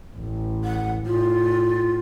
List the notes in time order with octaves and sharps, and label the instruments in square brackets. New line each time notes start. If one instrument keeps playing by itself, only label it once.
[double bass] A1
[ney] F#5
[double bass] A2 [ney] F4